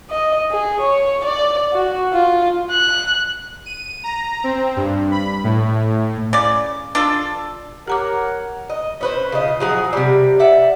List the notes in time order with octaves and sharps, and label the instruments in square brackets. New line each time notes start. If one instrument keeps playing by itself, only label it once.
[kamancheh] D#5
G#4
C#5
D5
F#4
F4
[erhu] F#6
[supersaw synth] D#7
A#5
C4
G2
B5
A2
[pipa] C#3 D5
D4 F4 A4
[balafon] G4 A#5 D6 [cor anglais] A#4 [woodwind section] C#5 F#5
[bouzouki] D#5
C#4 B4 C5
C#3 F4 D#5
F3 F#3 G#4
C3 G3
D5 E5 F#5